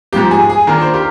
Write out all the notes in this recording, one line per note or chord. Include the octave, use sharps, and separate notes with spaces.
G#2 F3 A#3 G4
G#4
G#4
D#3 A#3 D4 F4 A#4
C5
G4 A#4